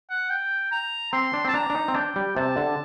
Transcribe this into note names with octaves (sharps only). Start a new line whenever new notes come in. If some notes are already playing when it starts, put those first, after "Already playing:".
F#5
G5
A#5
C4 C6
D4
C4 A5
D4 A#5
D4
D#4
C4
D4 G5
G3
C3 A5
D3